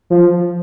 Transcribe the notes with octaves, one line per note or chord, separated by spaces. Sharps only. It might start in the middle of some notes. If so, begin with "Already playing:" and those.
F3